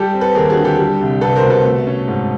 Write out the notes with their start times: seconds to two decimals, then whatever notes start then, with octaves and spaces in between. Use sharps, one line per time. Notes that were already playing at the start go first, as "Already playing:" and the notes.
Already playing: G3 G4 A4
0.14 C4
0.21 A4 B4
0.35 D#2 G#4 A#4
0.50 F#4 G#4
0.57 D3
0.65 G4 A4
0.79 G3
1.01 C2
1.21 C2 A4 B4
1.36 A#4 C5
1.43 B2
1.50 A4 B4
1.65 A3
1.87 C#4
2.08 G#2